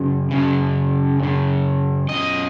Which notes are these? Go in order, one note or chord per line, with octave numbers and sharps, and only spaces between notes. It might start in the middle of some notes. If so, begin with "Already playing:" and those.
Already playing: F#2 C#3
F#2 C#3
F#2 C#3
F#2 C#3 D#5